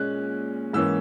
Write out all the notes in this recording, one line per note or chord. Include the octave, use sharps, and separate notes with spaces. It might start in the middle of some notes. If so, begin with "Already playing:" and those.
Already playing: A#2 G#3 C#4 F#6
G#2 E3 A#3 C#4 E6